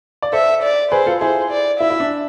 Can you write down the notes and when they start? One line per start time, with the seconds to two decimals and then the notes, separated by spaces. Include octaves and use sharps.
0.22 D5
0.33 A4 C5 E5
0.63 D5
0.91 G#4 B4 C5
1.06 F4 A4
1.21 E4 G#4 C5
1.51 D5
1.80 E4 E5
1.90 E4
2.00 D4